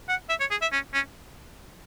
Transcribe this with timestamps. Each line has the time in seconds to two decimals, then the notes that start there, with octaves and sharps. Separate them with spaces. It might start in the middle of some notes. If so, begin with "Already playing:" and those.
0.09 F#5
0.29 E5
0.40 C#5
0.51 G#4
0.62 E5
0.72 C#4
0.94 C#4